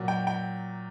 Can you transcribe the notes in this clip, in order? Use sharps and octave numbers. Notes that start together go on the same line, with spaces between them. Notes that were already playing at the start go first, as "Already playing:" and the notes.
Already playing: A#2 F#3
G5
G5